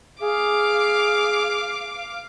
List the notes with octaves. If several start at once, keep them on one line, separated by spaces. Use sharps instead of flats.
G#4 F5 D6